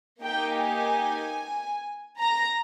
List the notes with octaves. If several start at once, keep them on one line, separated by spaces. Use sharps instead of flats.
A#3 D#4 G4 G5
G#5
A#5